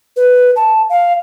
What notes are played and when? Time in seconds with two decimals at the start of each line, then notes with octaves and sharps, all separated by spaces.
0.17 B4
0.56 A5
0.90 F5